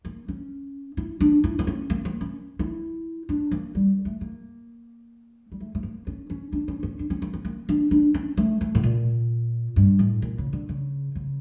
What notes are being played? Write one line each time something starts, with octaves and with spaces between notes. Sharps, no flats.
A#3
C#4
E4
D4
E4
A#3
C#4
A#3
A#3
C#4
E4
D4
A#3
G3
A3
A#3
G3
A3
A3
A#3
C#4
C#4
D4
C#4
C#4
D4
C#4
A#3
C#4
A#3
D4
D4
C#4
A3
A3
A2
A#2
G2
A2
A#2
C#3
D3
C#3
C#3